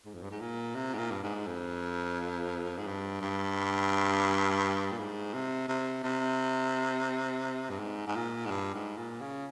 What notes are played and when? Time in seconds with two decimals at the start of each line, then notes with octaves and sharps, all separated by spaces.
0.05 G#2
0.14 F2
0.22 G2
0.31 G#2
0.41 A#2
0.75 C3
0.94 G#2
0.98 A#2
1.11 G2
1.23 G#2
1.46 F2
2.78 G#2
2.87 G2
3.21 G2
4.92 A#2
4.98 G#2
5.34 C3
5.68 C3
6.03 C3
7.70 G2
7.79 G#2
8.07 G#2
8.15 A#2
8.45 G#2
8.50 G2
8.74 G#2
8.97 A#2
9.21 C#3